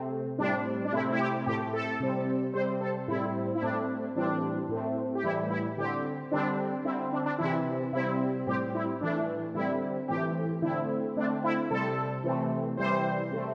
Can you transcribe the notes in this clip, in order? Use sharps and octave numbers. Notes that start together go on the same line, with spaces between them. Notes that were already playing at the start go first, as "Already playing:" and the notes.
Already playing: C3 A3 C4
A2 G3 C4 D4
D4
C3 A3 C4 E4
E4
G4
A2 A3 C4 G4
A4
C3 G3 C4
C3 G3 C4 C5
A4
A2 G3 C4 E4
E4
A2 A3 C4 D4
A2 E3 G3 C4 D4
A2 A3 C4
G4
A2 E3 G3 E4
E4
D3 C4 G4
D3 G3 C4 D4
D3 C4 E4
D4
D4
C3 E3 C4 E4
C3 G3 C4 E4
A2 G3 C4 G4
E4
A2 E3 A3 D4
D3 G3 C4 E4
A2 E3 A3 C4 G4
D3 A3 C4 E4
D3 A3 C4 D4
E4
C3 G3 C4 A4
C3 E3 A3 C4
C3 E3 G3 C4 C5
C3 A3 C4